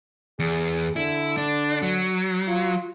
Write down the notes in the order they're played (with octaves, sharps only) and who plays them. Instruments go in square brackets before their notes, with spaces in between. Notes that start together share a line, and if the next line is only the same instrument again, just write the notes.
[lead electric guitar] E2 [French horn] G#4
[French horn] D3 [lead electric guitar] E4
[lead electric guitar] D4
F#3
[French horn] F4